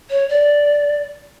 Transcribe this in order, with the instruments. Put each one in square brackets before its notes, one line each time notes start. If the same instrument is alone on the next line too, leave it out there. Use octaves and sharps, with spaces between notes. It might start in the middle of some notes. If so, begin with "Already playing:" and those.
[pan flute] C#5
D5